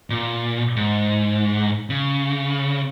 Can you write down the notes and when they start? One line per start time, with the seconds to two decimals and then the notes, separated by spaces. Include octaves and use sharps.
0.10 A#2
0.76 G#2
1.90 C#3